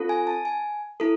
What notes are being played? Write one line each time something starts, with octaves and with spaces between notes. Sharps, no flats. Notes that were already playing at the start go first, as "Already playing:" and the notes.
Already playing: C4 F4 A4
G#5
A5
G#5
E4 A4